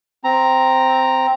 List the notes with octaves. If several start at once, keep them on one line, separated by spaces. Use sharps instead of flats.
C4 A#5